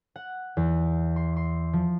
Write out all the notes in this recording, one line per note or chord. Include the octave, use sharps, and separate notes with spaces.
F#5
E2
C6
C6
F3